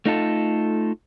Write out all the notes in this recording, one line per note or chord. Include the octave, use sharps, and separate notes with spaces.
A3 D#4 F4 A4